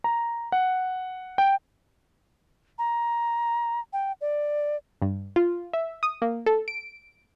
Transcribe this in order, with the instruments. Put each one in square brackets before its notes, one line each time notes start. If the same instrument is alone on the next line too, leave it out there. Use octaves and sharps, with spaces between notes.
[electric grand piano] A#5
F#5
G5
[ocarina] A#5
G5
D5
[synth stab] G2
F4
E5
D#6
A#3
A4
D7